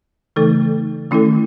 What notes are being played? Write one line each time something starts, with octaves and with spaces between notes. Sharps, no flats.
C#3 E3 A3 D#4 A4
D#3 A3 C#4 E4 A4